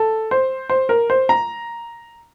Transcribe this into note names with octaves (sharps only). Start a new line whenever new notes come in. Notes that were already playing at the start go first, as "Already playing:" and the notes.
Already playing: A4
C5
C5
A#4
C5
A#5